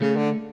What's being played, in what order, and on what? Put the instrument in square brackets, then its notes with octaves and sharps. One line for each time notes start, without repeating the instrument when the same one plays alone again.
[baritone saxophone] C#3 [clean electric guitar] A3
[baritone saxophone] D3